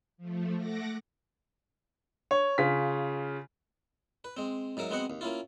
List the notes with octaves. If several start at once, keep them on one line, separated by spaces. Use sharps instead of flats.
F3 A3
A3 F#5 D6 A#6
C#5
C#3 F4 B6
B4
G#3 C4
G#2 F#3 A#4 E5
G#3 B3 C4 F#4 D#5 F#5
D#2
A#3 C#4 E4 F4